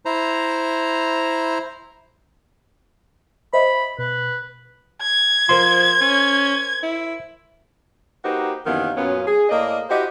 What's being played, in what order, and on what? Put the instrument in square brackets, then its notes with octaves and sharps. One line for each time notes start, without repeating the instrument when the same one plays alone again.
[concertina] E4 C5 A#5
[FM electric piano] C5 D#5 E5 [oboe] B5
[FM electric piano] B2 [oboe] B4
[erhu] G#6
[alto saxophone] F3 [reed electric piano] A#4 C5 C6
[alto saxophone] C#4
E4
[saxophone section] A#3 D#4 F#4 G4 B4 C5
F#2 C3 D#3 E3 A#3 B3
F#2 A#2 F#3 B3 C#4 F4
G#4
A2 A#3 D5 D#5
E4 F#4 G4 C5 D#5